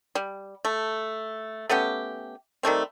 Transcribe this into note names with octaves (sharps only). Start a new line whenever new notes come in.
G3
A3
A3 B3 C#4 G4
D#3 G3 A3 C4